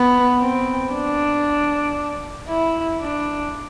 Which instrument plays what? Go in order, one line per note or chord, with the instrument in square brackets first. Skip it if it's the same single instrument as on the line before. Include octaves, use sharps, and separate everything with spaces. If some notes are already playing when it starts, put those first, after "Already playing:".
Already playing: [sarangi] B3
C4
D4
E4
D4